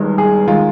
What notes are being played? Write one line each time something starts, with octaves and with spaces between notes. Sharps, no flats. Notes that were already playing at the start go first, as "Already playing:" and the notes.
Already playing: G1 G2 D#3 G#3
G#4
D#3 G#3 F4